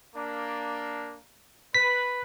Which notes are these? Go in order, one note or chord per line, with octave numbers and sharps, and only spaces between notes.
A#3 D4
B4 B6